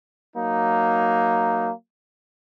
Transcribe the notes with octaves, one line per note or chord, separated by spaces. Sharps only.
F#3 A#3 D#4